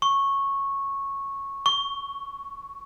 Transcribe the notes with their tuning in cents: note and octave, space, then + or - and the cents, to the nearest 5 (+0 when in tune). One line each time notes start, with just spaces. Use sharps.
C#6 -10
C#6 +15